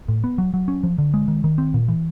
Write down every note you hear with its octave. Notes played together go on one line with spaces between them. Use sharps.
A2
B3
F#3
F#3
C#4
F3
D3
G#3
D#3
D#3
C4
A#2
E3